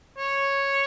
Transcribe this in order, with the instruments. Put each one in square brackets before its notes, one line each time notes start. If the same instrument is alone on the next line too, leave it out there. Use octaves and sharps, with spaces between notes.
[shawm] C#5